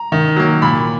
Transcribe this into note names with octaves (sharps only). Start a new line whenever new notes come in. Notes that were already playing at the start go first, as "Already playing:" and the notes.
Already playing: A#5
D#3
F#3 A#3
A#2 B5